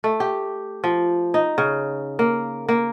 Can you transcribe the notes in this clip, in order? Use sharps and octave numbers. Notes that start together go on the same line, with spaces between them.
A3
G4
F3
D#4
C#3
A#3
A#3